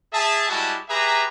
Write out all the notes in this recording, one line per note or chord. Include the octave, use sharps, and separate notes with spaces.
G#4 E5 A5
G3 G#3 E4 F#4 G4 A5
G4 G#4 B4 E5 A#5